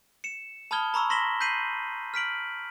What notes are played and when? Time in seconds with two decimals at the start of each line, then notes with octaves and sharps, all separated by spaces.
0.24 C#7 E7
0.71 A5 B5 D#6 F6 G#6 G7
0.94 A#5 B5 C#6 E6
1.10 C6 A#6 B6 E7 F#7 G7
1.41 G6 B6 C7 D#7 F#7
2.14 F6 B6 D7 F#7